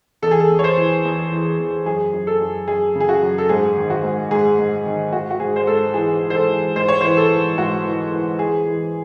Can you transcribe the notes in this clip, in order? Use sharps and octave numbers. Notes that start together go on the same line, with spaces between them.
E2 A4
G#4
A4
E2
C#5
C5
E3
E2
E3
E2
F#2 G#4
F#2
A4
F#2
F#2 G#4
C#3
G#4
F#4
F#2
A4
G#2 G#4
D#3
F#4
G#2
G#2 G#4
G#2
D#3
G#2 F#4
F#4
G#2 G#4
C5
G#2 A4
E3 G#4
E3
C5
A4
E3
G#2 C5
C#5
C5
E3
A4
E3
G#2 F#4
E3
E3
E3 G#4
E3